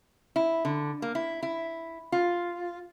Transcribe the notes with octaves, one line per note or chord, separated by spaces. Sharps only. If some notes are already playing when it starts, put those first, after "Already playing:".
E4
D3
A#3
E4
E4
F4